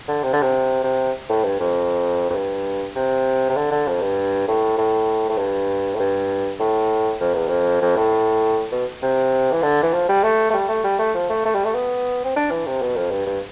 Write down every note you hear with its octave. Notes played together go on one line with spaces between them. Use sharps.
D3
C3
D3
C3
C3
A2
G2
F2
F2
G2
C3
C3
D3
D3
F2
G2
A2
A2
A2
G2
A2
G2
A2
F2
E2
F2
F2
A2
B2
C3
E3
D3
E3
F3
G3
A3
A3
G3
A3
G3
A3
F3
A3
A3
G3
A3
B3
C4
D4
E3
C3
B2
F2
G2
G2